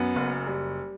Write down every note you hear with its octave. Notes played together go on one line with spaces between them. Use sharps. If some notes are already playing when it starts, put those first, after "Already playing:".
Already playing: F#2 B3
F#1
G3